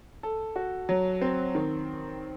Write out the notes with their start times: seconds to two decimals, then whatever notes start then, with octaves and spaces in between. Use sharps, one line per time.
0.23 A4
0.56 F#4
0.89 F#3
1.21 C4
1.55 D#3